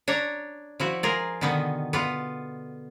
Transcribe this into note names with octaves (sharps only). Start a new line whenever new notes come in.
D4 C#5 A#5
F3 E4 F#4
F4 G#4 A#4
B2 D3 D#3 B3
B3 F4